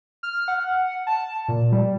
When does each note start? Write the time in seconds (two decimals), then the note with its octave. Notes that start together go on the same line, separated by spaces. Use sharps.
0.23 F6
0.48 F#5
1.07 A5
1.48 A#2
1.72 G3